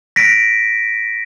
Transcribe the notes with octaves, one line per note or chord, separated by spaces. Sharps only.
A#6 B6 D7